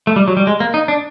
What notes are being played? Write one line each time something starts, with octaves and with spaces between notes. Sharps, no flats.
A3
G3
F#3
G3
G#3
A#3
D#4
D4